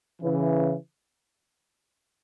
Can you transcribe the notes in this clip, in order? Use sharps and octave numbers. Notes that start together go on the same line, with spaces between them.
C#3 E3